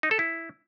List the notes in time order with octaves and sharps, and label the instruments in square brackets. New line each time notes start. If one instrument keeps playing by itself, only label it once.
[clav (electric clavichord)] D#4
A4
E4